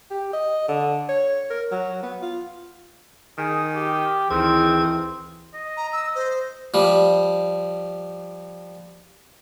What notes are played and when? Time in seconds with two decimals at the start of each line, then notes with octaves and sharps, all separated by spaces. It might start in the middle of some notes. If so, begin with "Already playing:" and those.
0.10 G4
0.33 D#5
0.68 D3
1.09 C#5
1.50 A#4
1.71 F#3
2.03 B3
2.22 F4
3.38 D#3 G#4
3.75 G4
4.31 D2 D#3 E3 C4 G#4
5.54 D#5
5.77 A#5
5.93 E6
6.15 C5
6.74 F3 G3